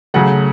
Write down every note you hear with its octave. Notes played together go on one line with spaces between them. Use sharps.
C#3 F#3 A3 F#5